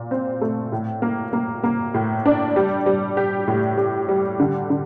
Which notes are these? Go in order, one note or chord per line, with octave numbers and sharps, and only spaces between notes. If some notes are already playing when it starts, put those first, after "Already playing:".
Already playing: A#2
C4
A3
A2
A#3
A#3
A#3
A2
D4
G3
G3
G4
A2
G4
G3
D3
D3